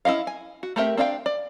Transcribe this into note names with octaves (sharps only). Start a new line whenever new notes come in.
C#4 E4 A4 D#5 F5
G#5
F#4
A3 C4 G4 A#4 E5
C4 D4 D5 F5 G5
D5